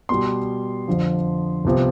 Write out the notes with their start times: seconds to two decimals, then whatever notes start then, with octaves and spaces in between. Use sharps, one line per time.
0.09 B2 G3 B3 C6
0.88 F2 D3 F3
1.65 C2 C3 F3 B3